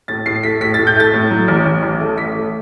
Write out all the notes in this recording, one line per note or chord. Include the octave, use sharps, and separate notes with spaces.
A2 A6
A2 C7
A3 B6
A2 B6
A2 A6
G6
A3 A6
A2
F#3
A1
A1
A1
A3
A1 B6
A3